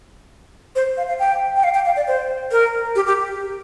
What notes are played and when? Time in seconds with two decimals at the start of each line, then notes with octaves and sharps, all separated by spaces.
0.75 C5
0.97 F5
1.08 F5
1.19 G5
1.56 G5
1.64 F5
1.74 G5
1.86 F5
1.96 D5
2.08 C5
2.51 A#4
2.95 G4
3.07 G4